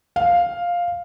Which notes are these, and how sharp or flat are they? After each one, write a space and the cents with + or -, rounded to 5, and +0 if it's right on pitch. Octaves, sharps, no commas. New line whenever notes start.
F5 +5